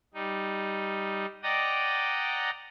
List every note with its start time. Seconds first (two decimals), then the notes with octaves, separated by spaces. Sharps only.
0.14 G3 D#4
1.43 D5 D#5 F#5 G5 A#5 D#6